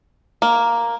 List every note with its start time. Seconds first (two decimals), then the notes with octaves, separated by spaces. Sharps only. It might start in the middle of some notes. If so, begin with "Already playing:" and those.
0.42 A#3